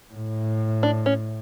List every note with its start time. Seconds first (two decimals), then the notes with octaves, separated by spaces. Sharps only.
0.14 A2
0.83 D4
1.06 C#4